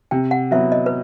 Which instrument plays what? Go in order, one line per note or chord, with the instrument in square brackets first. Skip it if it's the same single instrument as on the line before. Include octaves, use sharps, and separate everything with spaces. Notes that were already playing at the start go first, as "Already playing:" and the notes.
[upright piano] C3 [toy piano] G5
[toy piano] F#5
[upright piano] F#3 B3 E4 [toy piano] E5
[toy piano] D#5
B4